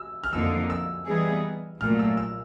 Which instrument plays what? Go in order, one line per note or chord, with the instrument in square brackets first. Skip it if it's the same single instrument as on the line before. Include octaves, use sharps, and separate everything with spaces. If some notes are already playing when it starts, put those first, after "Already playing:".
Already playing: [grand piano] E6
F6
[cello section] F2 D3 F3 A#3 D#4 [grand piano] E6
[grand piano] E6
[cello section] E3 G3 B3 D#4 G#4
[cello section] A#2 F#3 A3 [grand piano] F6
[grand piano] E6
E6